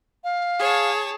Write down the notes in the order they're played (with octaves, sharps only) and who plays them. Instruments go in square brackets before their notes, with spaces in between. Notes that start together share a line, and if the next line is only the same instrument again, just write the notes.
[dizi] F5
[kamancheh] G#4 [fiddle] C#5 A5